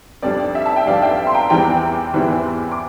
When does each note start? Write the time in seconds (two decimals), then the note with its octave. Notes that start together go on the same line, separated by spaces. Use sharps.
0.22 F2 C3 G3 D4 D5
0.55 E5
0.66 A5
0.76 G5
0.86 F2 C3 G3 D4 D5 F5
1.02 E5 G5
1.27 C6
1.34 G5 A#5
1.50 E2 E3 G3 C4 E4 G5 A#5
2.13 E2 E3 G3 C4 E4
2.72 D6